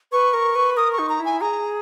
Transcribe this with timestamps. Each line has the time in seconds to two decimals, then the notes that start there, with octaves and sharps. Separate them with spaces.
0.12 B4 C#6
0.33 A#4
0.55 B4
0.77 A#4 D#6
0.93 C#6
0.99 D#4
1.09 A#5
1.20 E4
1.25 G#5
1.41 G#4 A#5